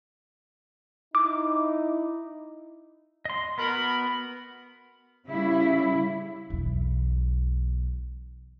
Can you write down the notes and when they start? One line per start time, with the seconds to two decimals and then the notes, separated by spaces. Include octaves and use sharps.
1.15 D#4 E4 D6
3.25 D#5 C6
3.58 B3 F#4 A#4 B5
5.26 C#3 G3 E4
6.50 B1 E2